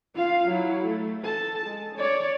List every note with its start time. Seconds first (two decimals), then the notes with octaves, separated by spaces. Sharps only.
0.15 F4 F5
0.48 F#3 E4
0.86 A3
1.22 A4 A5
1.66 G#3
1.95 C#5 D5